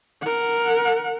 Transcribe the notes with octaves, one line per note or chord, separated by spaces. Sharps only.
A#4 F#5